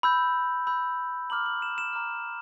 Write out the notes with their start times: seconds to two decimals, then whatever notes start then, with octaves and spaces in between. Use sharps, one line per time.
0.03 B5 E6 G6
0.67 B5 E6 G6
1.30 A#5 D6 F6 F#7
1.46 F#7
1.62 E7
1.78 E7
1.93 A#5 D6 F6